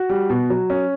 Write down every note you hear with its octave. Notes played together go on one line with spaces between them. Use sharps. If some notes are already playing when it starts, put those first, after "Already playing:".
Already playing: F#4
G3
B2
F#3
C#4